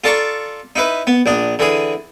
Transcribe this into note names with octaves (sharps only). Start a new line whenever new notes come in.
F4 A4 D5 A5 A#5 C#6
D#4 E4 B4
B3
A#1 D4 D#6
D3 E3 G#4